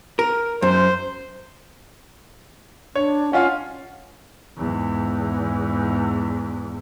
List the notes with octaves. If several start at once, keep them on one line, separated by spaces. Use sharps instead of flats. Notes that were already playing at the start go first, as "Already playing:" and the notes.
A#4
F#2 C5
D4 C#5
C#4 F4 F5 F#5
E2 G#2